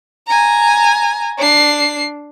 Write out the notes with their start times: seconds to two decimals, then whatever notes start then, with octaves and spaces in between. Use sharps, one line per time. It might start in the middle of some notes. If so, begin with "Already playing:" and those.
0.27 G#5 A#5
1.38 D4 C7